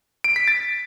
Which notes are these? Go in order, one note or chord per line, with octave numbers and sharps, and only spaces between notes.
D7
B6
A6